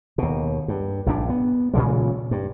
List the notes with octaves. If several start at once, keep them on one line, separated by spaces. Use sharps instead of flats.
D#2 B2
G2
A#1 G2 D4
B3
A#2 C#3 E3 G#3
G2